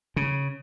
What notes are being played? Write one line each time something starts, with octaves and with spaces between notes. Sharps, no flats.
C#3